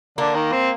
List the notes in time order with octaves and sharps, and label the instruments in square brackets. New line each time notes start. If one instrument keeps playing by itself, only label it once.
[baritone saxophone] D3 [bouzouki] A#3
[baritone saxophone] D#3
C4